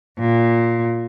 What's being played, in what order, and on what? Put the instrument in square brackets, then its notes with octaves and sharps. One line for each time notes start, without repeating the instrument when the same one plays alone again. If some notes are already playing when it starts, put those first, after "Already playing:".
[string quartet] A#2